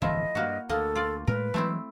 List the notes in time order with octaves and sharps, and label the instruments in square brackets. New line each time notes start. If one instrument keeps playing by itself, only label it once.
[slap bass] D1 G1 E3 [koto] F3 A3 E4 [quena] D#5
[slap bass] G2 [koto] A#3 F#4
[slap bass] D2 [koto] A#3 D#5 [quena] A4
[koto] F4 D5
[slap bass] A2 G#3 [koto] A#4 [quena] B4
[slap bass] E3 F#3 G#3 [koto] A3 C4 E4